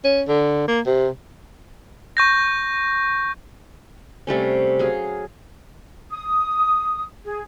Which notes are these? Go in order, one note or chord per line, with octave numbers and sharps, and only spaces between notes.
C#4
D3
A#3
C3
C#6 G6 A#6
C3 G3 A3 C#4
F#3 G#4 F5
D#6
G#4